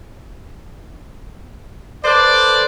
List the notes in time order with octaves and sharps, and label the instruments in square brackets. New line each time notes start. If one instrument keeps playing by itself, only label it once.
[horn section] A4 B4 C5 D5